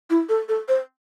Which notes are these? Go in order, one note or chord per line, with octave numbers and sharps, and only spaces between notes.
E4
A4
A4
C5